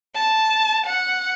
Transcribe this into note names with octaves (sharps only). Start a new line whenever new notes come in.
A5
F#5